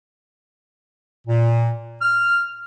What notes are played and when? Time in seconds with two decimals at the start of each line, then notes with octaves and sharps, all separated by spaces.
1.27 A#2
2.02 F6